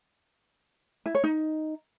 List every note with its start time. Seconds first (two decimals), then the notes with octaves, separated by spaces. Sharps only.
1.06 E4
1.15 C#5
1.24 D#4